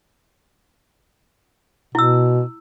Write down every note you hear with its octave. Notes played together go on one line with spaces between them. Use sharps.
B2 E4 E6